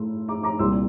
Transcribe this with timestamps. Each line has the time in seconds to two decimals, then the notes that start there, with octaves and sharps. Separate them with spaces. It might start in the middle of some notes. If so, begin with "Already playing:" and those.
Already playing: A2 C6 E6
0.28 A#5 D6
0.43 A#5 D6
0.59 C2 A#2 G3 C6 E6